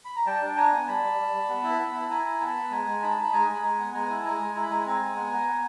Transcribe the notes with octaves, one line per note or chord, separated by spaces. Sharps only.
B5
A#5
G3 G5 A5
D4
A5
D4 G#5 A#5
B3
G3 A5 B5
G3
G3
G3
B3
E4
B3
E4
A5
E4 G#5 A#5
E4
B3 A5 B5
B3
G#3 G#5 A#5
G#3
D#4 A5 B5
D#4
B5
G#3 G#5 A#5
G#3
B5
G#3 G#5 A#5
B3
G#3 G#5 A#5
E4
A5
G#3 G#5 A#5
G#3
E4 A#5
B5
G#3 G#5 A#5
C4 G#5 A#5
G#3
B3
B3
B3